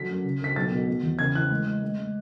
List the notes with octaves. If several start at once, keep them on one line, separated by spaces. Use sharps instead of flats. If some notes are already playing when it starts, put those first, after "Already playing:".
Already playing: D3 F#3 B6
F#2
C#3
D2 B6
B1 A6
B2
B2
E2
C#3 G#6
E3 F#6
G#3
G#3
G#3
G#3